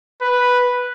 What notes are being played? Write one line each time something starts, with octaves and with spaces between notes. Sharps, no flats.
B4